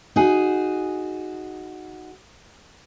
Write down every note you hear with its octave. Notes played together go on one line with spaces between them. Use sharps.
D#4 F#4 G#4